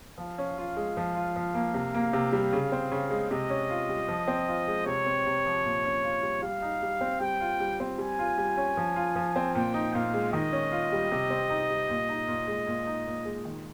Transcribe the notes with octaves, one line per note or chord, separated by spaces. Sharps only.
F3 F5
C#4
F4
G#3
F3
F4
F3
A#3
C3
A#3
C3
G3
C#3
C4
C#3
G#3
C3 D#5
C#4
F4
G3
F3
C4
F4
G#3
C3 C#5
C4
C3
F3
A#2
C#4
F4
G3
G3 F5
D#4
G3
C4
G3 G5
F4
G3
C4
G3 G#5
F4
G3
C#4
F3
F4
F3
C4
A#2 G5
D#4
A#2 F5
G#3
D#3 D#5
C#4
F4
G3
C3
C4
D#4
G3
A#2
D#4
A#2
G#3
A#2
D#4
A#2
G#3
D#3